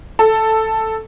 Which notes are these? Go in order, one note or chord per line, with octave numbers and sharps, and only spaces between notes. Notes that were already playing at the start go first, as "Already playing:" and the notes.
A4